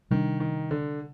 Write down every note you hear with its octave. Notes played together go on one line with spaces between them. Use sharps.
C3 D#3 G3 A#3 D4
D#3
D3